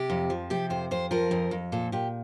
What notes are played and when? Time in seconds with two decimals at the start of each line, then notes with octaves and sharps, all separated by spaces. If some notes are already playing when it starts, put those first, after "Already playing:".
Already playing: C3 G4
0.10 F2
0.30 F3
0.50 C3 G4
0.70 F2 C5
0.91 F2 C5
1.11 F3 A#4
1.31 F2
1.51 F2
1.72 A#2 A4
1.92 A#2 G4